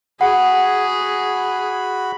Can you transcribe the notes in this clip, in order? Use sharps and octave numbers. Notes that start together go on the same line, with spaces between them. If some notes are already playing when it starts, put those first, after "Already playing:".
F#4 G#4 F#5 B5